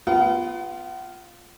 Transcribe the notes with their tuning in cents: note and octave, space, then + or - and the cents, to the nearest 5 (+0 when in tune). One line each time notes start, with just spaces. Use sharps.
B3 +0 F4 -5 F#5 +40